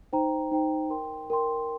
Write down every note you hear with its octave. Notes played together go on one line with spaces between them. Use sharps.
D#4 C5 G5 A#5
D#4 C5 G5 A#5
A#4 G5 C6
A#4 G5 C6